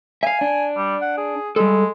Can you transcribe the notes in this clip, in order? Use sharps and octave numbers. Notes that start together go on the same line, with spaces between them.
E5 F5 G#5
D4
G3
F#5
G#4
G3 G#3 A4